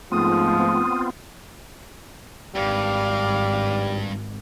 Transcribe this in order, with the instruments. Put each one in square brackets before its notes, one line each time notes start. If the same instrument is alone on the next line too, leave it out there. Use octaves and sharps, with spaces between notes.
[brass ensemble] G#2 F3 [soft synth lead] A3 [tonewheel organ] B3 C4 F4 [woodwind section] D#6
[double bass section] G#1 [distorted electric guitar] G2 [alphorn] G3 [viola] F5 D6